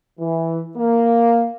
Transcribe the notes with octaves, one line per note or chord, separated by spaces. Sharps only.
E3
A#3